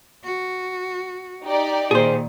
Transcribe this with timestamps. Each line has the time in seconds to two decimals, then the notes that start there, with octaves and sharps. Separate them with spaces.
0.24 F#4
1.43 D#4 G4 D5
1.91 A#2 D#3 G#4 C5